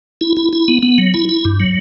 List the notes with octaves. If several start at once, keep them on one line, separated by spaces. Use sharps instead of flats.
E4
E4
E4
B3
B3
F#3
E4
E4
G2
F#3